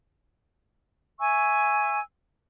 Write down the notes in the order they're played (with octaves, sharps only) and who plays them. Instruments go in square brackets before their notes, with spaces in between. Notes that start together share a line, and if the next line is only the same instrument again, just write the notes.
[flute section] E5 G#5 C#6 E6